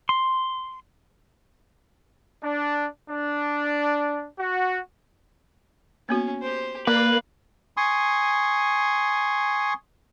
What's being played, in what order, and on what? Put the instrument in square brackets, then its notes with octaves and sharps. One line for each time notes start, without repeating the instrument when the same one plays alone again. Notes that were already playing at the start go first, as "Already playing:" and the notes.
[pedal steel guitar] C6
[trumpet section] D4
D4
F#4
[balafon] A#3 B3 F#4 [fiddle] C#4
[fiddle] G4 C5
[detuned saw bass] A#3 [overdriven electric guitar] B4 [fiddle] D5 F5
[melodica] G#5 C6 C#6 D#6